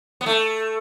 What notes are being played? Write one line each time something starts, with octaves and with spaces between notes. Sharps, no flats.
B3
A3